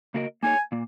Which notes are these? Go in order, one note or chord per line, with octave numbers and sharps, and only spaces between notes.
C#3 A#3 F#4 A#4 D#5
A#3 D#4 G#4 C#5 G#5
A#2 A#3